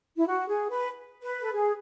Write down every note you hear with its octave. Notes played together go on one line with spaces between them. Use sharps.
E4
F#4
G#4
B4
B4
A4
G#4